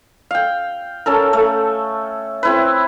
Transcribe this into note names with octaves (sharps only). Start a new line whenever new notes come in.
F5 G5
C#4 A4 A#4
A3
C4 E4 B4